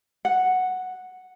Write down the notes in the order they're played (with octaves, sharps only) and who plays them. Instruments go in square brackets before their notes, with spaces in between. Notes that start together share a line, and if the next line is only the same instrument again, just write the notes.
[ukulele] F#5